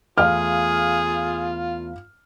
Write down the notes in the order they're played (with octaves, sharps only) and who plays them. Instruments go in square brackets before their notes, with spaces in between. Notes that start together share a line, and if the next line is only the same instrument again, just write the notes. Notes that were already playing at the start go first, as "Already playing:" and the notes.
[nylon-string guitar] E2 A3 [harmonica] F4 [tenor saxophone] G#4 [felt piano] F5 F6